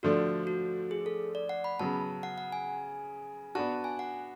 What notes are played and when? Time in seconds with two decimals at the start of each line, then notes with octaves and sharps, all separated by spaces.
0.03 D3 F3 A3 D4 F#4
0.47 F#4
0.91 G#4
1.06 A4
1.35 D5
1.49 F#5
1.64 B5
1.79 C#3 F#3 B3 A5
2.23 F#5
2.38 F#5
2.52 G#5
3.55 B3 D4 F#4 A5
3.84 G#5
3.99 F#5